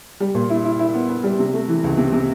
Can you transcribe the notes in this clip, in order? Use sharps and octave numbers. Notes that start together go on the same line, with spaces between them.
G3
A#2
E4
E4
E4
B3
B3
G3
C3
A3
E3
C#2
C3
C3